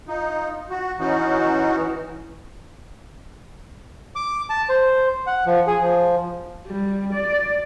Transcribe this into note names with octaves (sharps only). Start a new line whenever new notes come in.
D#4 F4
F#4
E3 C#4 D#4 F#4
D6
A5
C5
F#5
F3
G#4
F3
G3
D5